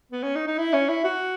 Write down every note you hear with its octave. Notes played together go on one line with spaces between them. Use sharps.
B3
C#4
D#4
D#4
E4
C#4
E4
F#4